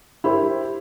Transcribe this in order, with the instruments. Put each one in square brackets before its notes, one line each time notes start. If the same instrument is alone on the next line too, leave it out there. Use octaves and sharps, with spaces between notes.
[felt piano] E4 G4 A#4 C5